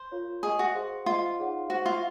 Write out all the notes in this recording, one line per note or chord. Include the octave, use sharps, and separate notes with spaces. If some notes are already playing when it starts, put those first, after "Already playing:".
Already playing: C5
F4 A#4 C#5 F5
G#4 A#4 D#5 G#5 C#6
F#4
G#4 C5 F5 C6
F4 C5 D#5 F#5
D#4 G#4 C#5 F#5
F#4 C5 F#5 C#6
F4